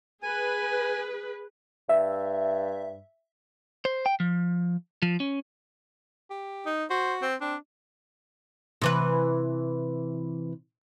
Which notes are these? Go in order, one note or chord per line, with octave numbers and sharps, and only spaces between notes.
G#4 B4 G#5
G2 E5
C5
G5
F3
F3
C#4
G4
D#4
F#4 C5
C4
C4 D4
C3 E3 B4